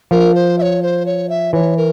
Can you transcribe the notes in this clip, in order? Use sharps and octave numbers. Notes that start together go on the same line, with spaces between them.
F3 A#4
C5
E5
C#5
C5
C#5
E5
E3 C#5
A#4